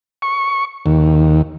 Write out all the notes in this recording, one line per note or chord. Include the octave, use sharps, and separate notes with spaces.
C#6
D#2